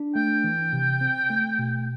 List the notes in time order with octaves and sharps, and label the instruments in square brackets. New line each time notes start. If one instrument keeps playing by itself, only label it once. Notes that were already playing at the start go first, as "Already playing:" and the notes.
Already playing: [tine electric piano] D4
[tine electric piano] A3 [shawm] G5
[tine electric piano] E3
C3
C4
A3
B2